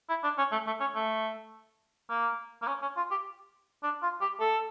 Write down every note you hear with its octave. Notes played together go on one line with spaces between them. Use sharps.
E4
D4
C#4
A3
A3
C#4
A3
A#3
A#3
C#4
C#4
F4
G4
D4
F4
G4
A4